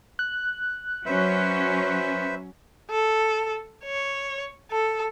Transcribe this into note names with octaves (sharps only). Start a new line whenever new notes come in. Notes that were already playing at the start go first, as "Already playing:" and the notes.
F#6
F#3 C#4 B4 C5 E5
A4
C#5
A4